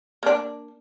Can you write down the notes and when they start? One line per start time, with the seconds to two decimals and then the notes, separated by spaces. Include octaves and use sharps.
0.23 A#3 D4